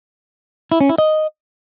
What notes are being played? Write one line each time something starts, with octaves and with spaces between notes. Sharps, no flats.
E4
C#4
E4
D#5